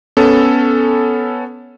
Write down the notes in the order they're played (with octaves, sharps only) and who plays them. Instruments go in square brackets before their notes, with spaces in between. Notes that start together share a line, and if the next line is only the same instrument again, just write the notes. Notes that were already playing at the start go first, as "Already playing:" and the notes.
[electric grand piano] B3 C#4 A4